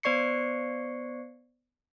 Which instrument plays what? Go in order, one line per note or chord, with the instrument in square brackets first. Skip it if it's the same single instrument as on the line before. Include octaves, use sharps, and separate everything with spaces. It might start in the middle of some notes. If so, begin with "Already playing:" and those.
[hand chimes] B3 C5 D5 C#6 C7 C#7